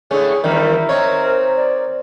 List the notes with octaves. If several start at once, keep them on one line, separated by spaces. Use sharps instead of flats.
A2 D3 A3 C#4 G#4
E2 G2 D#3 G3 A#4 E5
C4 D#4 C#5
D5